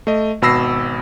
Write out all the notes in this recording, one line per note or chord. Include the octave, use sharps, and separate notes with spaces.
A3 D#5
G#1 B2 B5 E6 A#6 C7